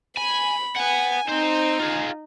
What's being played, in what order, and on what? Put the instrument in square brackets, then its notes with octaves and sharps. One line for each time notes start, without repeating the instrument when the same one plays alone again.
[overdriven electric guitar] G#5 [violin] B5
[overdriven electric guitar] B4 F#5 [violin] G#5
[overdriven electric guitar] C4 C5 [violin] D#4
[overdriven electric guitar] F4 G#4